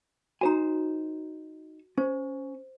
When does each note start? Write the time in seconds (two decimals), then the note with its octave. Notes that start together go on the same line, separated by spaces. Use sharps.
0.41 D#4 F#4 C5 G#5 A#5
1.98 C#4 C5